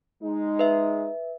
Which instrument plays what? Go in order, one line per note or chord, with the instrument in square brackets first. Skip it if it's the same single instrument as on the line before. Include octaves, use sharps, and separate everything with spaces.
[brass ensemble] G#3 D#4
[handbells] B4 E5